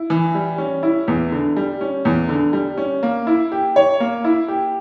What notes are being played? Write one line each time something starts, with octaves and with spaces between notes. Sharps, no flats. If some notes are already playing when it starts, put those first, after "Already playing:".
Already playing: E4
E3
G3
C#4
E4
E2
D3
G3
C#4
E2
D3
G3
C#4
A#3
E4
G4
C#5
A#3
E4
G4